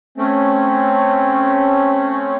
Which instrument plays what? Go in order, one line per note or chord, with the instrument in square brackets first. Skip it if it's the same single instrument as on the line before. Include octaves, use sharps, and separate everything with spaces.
[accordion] A3 C4 C#4